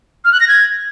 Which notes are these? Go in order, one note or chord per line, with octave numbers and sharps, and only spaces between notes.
F6
F#6
A#6
G#6